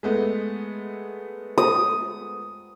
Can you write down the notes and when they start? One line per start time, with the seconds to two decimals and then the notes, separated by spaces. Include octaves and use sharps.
0.03 G#3 A3 B3
1.58 D#6